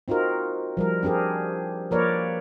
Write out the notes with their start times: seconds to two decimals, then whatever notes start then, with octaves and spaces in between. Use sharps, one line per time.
0.08 C4 D#4 F4 F#4 A#4
0.77 F3 G3 A#4
1.03 C4 D4 G4 G#4 A#4
1.91 F3 A#3 A#4 B4 C#5 D5